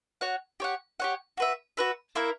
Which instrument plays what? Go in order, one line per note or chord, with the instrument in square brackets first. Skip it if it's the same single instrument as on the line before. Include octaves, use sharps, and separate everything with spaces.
[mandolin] F#4 C#5 F#5
G4 C#5 F#5
G4 C#5 F#5
F#4 B4 E5
F#4 B4 E5
A#3 E4 A#4 E5